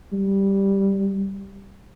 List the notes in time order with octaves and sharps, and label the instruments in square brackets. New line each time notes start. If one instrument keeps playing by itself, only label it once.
[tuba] G3